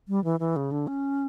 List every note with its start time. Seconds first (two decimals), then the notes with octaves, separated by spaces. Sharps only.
0.08 G3
0.24 E3
0.40 E3
0.56 C#3
0.72 D3
0.87 C#4